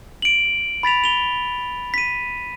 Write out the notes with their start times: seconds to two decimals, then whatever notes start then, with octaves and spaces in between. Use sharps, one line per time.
0.22 D7 F#7
0.83 B5 A6 B6 F7
1.04 F7 G7
1.94 B6 D#7